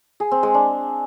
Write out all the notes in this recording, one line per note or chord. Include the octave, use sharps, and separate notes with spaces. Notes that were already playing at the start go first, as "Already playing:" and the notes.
G#4
C4
G#3
D4